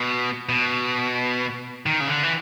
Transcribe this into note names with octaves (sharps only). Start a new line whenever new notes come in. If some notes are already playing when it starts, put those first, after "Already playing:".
Already playing: B2
B2
D#3
C#3
D3
E3